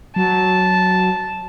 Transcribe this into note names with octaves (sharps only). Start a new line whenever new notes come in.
F#3 A5